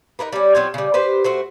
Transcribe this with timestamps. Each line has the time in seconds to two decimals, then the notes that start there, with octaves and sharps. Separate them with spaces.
0.19 D#4 G#4 A#4 B4
0.33 G3 C#4
0.55 F#3 C4 F4 G#5
0.74 C#3 G3
0.94 G4 B4 C5
1.24 A3 F#4 C5